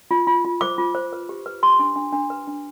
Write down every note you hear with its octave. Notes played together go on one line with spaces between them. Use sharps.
F4
F4
F4
C5 D6
F4
C5
B4
G4
B4
G4 C6
D4
D4
D4
B4
D4